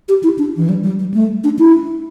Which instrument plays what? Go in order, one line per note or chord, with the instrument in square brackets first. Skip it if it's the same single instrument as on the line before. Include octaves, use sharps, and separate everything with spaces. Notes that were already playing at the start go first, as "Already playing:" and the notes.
[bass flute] G4
E4
D4
E3
G3
G3
G3
A3
D4
E4